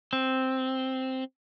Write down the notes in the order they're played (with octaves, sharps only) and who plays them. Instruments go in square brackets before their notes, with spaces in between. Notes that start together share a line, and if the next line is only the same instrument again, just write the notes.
[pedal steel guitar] C4